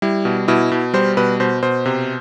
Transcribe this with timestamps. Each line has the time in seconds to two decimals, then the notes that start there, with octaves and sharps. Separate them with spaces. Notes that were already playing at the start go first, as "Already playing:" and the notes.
0.02 G3 E4
0.25 B2
0.48 B2 E4
0.71 B2
0.94 G3 C5
1.17 B2 B4
1.40 B2 C5
1.63 B2 C5
1.86 C3